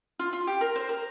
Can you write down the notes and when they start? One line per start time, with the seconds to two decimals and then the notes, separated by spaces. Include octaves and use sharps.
0.19 F4
0.33 F4
0.47 G4
0.61 A#4
0.76 C5
0.89 A#4